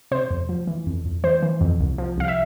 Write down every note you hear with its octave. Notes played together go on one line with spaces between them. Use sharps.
C3 C5
F2
F3
E3
F2
F2
E3 C5
E3
F2
C2
F3
C2 F5
E5